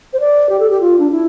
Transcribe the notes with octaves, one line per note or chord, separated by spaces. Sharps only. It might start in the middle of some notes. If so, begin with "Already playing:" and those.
C5
D5
G4
A4
G4
F4
D4
E4